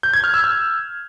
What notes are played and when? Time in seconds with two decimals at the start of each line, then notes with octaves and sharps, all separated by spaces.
0.03 G6
0.13 G#6
0.24 F6
0.34 E6
0.44 E6